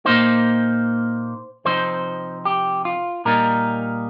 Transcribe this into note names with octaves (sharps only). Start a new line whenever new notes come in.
A#2 A#3 D#4 C5
C3 F3 C4 D#4 C5
G4
F4
A#2 G3 D#4 A#4